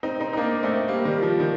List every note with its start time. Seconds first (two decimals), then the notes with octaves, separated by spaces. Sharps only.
0.03 C4 D#4
0.20 C4 D#4
0.33 D#4
0.37 A#3 D4
0.63 A3 C4
0.88 G3 A#3
1.05 D#3 G3
1.18 G3
1.22 F3
1.40 D#3